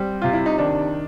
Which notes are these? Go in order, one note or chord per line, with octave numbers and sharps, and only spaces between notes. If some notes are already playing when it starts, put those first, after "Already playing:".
Already playing: G3 C4
C3 F4
E4
D#4
D#3 D4